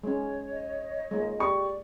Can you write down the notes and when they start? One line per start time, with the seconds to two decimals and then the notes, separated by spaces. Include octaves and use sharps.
0.03 G#3 C#4 C#5
0.52 D#5
1.11 G#3 A#3
1.39 G4 D5 C#6